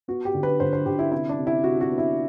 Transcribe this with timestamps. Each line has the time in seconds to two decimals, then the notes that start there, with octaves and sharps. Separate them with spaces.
0.08 B3 F#4
0.25 G4
0.34 D3
0.43 B4
0.60 D3 C5
0.73 C5
0.86 D3 G4
0.99 E4
1.11 C3 E4
1.29 D4
1.38 C3
1.47 E4
1.64 C3 F#4
1.81 F#4
1.89 B3
1.98 E4